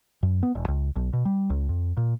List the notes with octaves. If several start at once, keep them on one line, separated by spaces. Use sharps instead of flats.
F#2
B3
E1
C#2
B1
B2
G3
C#2
F2
A#2